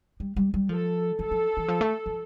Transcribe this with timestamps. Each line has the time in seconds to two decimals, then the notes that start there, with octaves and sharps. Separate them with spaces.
0.20 G3
0.36 G3
0.54 G3
0.69 F3 A4
1.19 F3 A4
1.31 F3
1.57 E3
1.68 F3
1.81 A3
2.06 F3